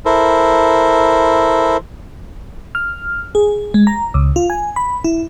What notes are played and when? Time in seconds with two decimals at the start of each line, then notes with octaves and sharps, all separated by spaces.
0.05 E4 A4 A#4 C5
2.75 F6
3.35 G#4
3.74 G#3
3.87 A#5
4.14 C#2
4.36 F4
4.50 G#5
4.76 B5
5.04 E4